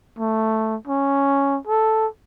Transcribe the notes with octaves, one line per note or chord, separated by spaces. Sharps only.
A3
C#4
A4